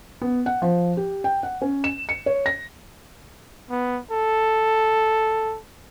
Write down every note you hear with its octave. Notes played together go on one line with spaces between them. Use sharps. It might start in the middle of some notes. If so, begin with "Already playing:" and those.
B3
F#5
F3
G4
G5
F#5
C#4
E7
C#7
C#5
A#6
B3
A4